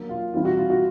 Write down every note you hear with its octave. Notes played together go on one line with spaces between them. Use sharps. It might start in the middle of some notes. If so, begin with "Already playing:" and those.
Already playing: F#3 A#3 D4
F4
E3 G3 C4 E4 F4
F#4
F4
F#4